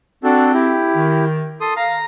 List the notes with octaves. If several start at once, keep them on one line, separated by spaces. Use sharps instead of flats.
C4 D4 F#4 A4
E4 G4
D#3
A4 C6 D#6
F5 A#5